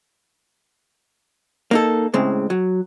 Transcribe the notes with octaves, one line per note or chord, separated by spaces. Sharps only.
A#3 D#4 A4
A2 C#3 G#3 C4
F#3